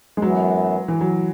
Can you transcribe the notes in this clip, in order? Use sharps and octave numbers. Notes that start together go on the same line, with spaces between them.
G#3
F#2 E3 F#3 B3
E3
F#3